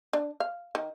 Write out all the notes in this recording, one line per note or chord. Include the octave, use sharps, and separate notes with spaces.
D4
F5
D#3